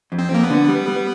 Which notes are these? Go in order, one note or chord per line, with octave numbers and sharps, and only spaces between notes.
F2
C4
F2 A#3
B3
D3
G3
G3